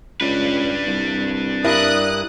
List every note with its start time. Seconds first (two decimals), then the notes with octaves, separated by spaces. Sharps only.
0.21 C#2 D4 B4
0.87 C2
1.64 G2 E4 A#4 D#6 F#6